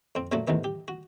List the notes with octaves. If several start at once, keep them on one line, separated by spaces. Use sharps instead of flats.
F2 C4
A#2 F3 F#3 A3 F#4
A1 D#2 C3 D#3 B3
G4
F#4